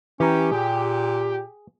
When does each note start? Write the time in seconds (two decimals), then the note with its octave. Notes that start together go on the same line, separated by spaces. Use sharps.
0.20 E3 C#4 G4 A#5
0.52 A#2 G#4